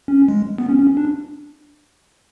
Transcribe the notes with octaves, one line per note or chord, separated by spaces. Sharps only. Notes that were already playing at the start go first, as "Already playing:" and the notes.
C#4
G#3
B3
C#4
C#4
D4